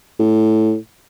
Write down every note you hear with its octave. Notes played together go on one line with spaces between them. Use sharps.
A2